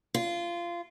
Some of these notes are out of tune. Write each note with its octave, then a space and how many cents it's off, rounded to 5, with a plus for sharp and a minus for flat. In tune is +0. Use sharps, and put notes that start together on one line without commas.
F4 -20